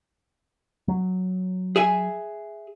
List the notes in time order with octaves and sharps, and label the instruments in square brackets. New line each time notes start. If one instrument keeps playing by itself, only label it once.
[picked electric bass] F#3
[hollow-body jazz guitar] G#4 E5 G#5